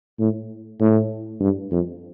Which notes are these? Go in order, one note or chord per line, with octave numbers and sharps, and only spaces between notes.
A2
A2
G2
F2